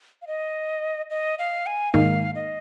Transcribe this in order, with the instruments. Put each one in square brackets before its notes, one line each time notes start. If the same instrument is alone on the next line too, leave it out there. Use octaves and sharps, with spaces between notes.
[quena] F5
D#5
D#5
F5
G#5
[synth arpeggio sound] G#2 D#3 A#3 D#4 [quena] F5
[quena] D#5